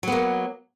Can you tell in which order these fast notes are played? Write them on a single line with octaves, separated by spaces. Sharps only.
F#3 B3 A#3